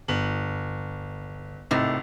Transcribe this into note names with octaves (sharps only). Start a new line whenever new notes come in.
G1 F#7
G#1 A2 C3 D#4